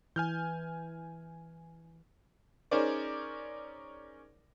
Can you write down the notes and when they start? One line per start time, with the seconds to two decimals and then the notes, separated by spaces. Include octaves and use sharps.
0.16 E3 G#5 F6 G6
2.71 C#4 D#4 G#4 A#4 C5 D5